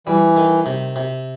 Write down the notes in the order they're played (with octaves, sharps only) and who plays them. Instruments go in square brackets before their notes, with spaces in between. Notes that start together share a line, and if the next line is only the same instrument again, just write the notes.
[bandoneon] E3 [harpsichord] G3
[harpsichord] D#3
C3
C3